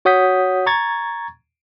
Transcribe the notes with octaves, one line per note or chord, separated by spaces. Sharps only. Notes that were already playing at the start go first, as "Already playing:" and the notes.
F#4 C#5 F#5 D#6 G6 B6
A#5 C#6 G#6 A6